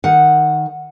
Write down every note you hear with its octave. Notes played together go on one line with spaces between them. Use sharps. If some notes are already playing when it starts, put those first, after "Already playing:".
D#3 F#5